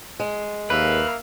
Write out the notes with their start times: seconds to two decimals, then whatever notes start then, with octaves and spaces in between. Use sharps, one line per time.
0.20 G#3
0.70 D#2 A#3 B4 E5 F5